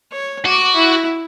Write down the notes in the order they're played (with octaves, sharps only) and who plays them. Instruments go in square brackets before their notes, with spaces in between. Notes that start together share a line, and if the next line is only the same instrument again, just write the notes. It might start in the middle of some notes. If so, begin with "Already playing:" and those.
[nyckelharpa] C#5
[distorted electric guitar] F#4 [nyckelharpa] D6
[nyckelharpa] E4